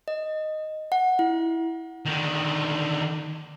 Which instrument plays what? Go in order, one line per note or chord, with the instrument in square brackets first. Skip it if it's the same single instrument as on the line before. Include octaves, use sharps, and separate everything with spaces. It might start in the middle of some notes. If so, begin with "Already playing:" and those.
[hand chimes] D#5
F#5
E4
[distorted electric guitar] D3 D#3